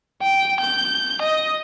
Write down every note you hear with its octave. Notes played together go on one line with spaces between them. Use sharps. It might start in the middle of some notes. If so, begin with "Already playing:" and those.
G5
G6
D#5